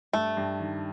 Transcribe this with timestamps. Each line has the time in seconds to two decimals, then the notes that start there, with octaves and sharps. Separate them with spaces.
0.13 G2 A3
0.37 G2
0.60 D#3